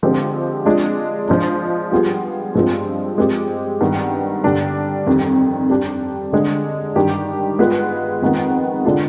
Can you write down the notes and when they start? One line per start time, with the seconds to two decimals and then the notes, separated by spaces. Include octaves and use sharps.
0.03 D3 F3 G#3 C4 G4
0.65 G#3 D4 F4
1.28 F3 G#3 D4
1.92 G3 B3 F4 G#4
2.55 G2 F3 G#3 C4 F4
3.18 G#3 C4 G4
3.81 G2 D#3 B3
4.44 G2 D3 G3 D4
5.07 F2 D#3 G3
5.70 G3 D4 G4
6.32 D3 G#3 D4
6.96 G2 D#3 G3 D4 G4
7.59 G#3 B3 F4 B4
8.22 F2 D#3 G#3 B3
8.85 D3 G#3 D4 F4